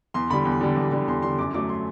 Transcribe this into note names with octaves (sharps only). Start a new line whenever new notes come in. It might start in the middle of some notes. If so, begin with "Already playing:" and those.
E2 C6
D3 G3 B5
E2
D3 G3
E2
D3 G3
E2 C6
D3 G3 C6
F#2 D6
F#3 A3 D6
C6